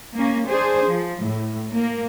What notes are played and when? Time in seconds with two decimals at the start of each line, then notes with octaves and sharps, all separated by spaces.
0.15 A#3 C#4
0.48 D4 G#4 C5
0.87 F3
1.21 A2
1.77 A#3